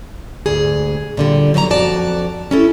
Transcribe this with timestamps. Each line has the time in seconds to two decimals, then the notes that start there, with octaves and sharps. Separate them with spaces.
0.46 D2 G#2 G#4
1.17 A#2 D3 G3
1.54 D3 F#3 B3 A5 A#5
1.70 F2 F#4 D5 A5
2.51 C#4 E4 A4